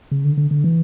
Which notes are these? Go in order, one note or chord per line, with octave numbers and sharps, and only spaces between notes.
C#3
D3
D3
D3
E3